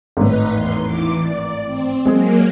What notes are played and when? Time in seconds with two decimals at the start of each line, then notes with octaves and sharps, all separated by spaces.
0.17 G#1 A2 D#4 B4
0.49 E2 C6
0.85 E3 D6
1.19 D5
1.64 C4
2.05 F#3 G#3 A#3 C4 G#4